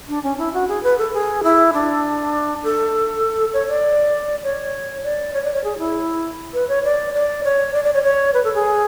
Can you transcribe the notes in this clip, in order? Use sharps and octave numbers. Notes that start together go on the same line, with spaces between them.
D4
C#4
E4
F#4
G#4
B4
A4
G#4
E4
D4
A4
C#5
D5
C#5
D5
C#5
D5
C#5
G#4
E4
B4
C#5
D5
D5
C#5
D5
D5
C#5
C#5
B4
A4
G#4